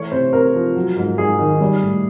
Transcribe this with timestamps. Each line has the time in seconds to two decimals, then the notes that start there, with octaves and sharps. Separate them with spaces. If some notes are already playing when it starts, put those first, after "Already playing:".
Already playing: E3 A3 C#5
0.12 C3 C5
0.33 C3 A#4
0.54 F3
0.76 F#3
0.97 G#2
1.18 G#2 G#4
1.39 D#3
1.61 G3
1.81 A2